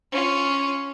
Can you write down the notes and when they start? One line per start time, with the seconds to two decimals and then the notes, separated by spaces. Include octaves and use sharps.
0.12 C#4 F4